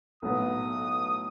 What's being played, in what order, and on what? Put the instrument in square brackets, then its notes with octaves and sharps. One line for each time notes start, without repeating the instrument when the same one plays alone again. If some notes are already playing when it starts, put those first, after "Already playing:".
[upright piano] B1 A2 F#3 B3 [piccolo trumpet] D#6